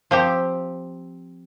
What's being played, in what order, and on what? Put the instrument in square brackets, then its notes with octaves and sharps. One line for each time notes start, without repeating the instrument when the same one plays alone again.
[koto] F3 C4 G4